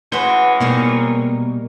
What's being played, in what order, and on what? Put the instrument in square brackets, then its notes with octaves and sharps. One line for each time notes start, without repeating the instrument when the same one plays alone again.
[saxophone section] E3 G#3 C#4 [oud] F#4 B4 C5
[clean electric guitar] B2 [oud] G3 A#3 D#4